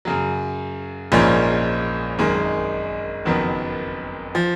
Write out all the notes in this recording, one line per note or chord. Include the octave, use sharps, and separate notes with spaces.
F#2 C#3 F#3
A#1 G#2 F3 A#3 C#4
G#1 F#2 D#3 G#3
F#1 F2 D#3 F#3 B3
F3